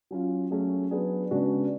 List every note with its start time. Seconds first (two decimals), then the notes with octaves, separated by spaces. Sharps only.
0.11 F#3 C#4 F4
0.51 F#3 A3 C#4 G#4
0.91 F#3 B3 D4 G#4
1.31 C#3 G#3 B3 D4 F#4